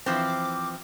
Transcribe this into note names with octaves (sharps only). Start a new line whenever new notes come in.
E3 F3 C4 D6